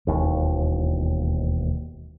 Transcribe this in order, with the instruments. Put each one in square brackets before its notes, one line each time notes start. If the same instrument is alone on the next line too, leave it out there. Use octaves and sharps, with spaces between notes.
[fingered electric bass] E1 D#2